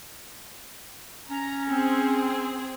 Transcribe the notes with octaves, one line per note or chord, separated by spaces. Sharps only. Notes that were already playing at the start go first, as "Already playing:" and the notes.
C#4 A#5
C4 G#4